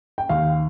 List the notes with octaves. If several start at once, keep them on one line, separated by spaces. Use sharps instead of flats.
G5
D#2 F5